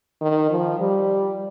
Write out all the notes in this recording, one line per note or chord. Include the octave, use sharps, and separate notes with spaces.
D#3
F3
G3